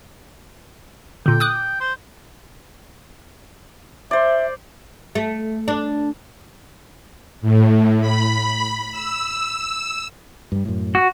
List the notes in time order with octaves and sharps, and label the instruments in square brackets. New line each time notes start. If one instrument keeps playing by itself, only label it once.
[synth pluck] A#2 D3 [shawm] G5
[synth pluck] D6 D#6 F#6
[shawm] C5
[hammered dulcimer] C5 D5 [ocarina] E5
[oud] A3
D4
[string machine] A2
B5
E6
[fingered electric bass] G2 G3
F#2 A2
[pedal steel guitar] F#4